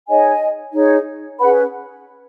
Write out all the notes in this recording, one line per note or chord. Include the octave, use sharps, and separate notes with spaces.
D#4 G#4 C#5 D#5 G#5
D#4 G#4 C#5
C#4 G#4 B4 F#5 B5